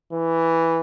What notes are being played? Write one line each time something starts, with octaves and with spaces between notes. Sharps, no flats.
E3